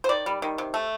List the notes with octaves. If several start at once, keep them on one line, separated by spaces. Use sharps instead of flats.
C5
D#3 D5
G3
D#3
C3
A3